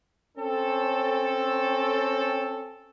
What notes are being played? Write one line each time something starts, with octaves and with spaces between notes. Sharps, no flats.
C4 C#4 A4